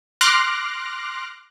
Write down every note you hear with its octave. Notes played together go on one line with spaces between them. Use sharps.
C6 D6 F6 F#6 A#6